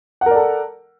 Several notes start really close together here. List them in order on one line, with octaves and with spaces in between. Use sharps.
F#5 A#4 D5 A4